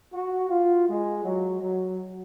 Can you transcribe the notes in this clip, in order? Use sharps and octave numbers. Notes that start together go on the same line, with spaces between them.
F#4
F4
G#3
F#3
F#3